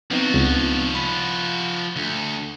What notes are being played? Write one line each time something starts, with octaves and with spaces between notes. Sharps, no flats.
F3 B3 C4 D#4 F#4
C#2
B5
D2